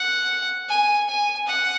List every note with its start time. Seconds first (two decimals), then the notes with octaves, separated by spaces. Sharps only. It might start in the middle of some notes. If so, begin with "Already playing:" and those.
Already playing: F#5
0.69 G#5
1.08 G#5
1.47 F#5